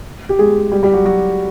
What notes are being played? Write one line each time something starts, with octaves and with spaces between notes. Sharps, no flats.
G4
G#3 G#4
G3 G4
G3 G4
F#3 F#4
F#3 F#4